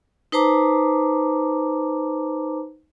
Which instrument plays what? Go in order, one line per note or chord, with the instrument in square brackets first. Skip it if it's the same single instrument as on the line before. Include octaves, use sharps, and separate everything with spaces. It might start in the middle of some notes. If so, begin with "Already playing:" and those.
[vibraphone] D#4 B4 C5 A5 A#5 D6